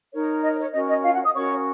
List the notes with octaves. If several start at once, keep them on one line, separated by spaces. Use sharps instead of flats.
D#4 A#4 C#5
D#5
C#5
C#4 F#4 A#4 C#5 D#5
D#5
F4 F5
F#4 F#5
D#5 D#6
C#4 F#4 A#4 C#5 C#6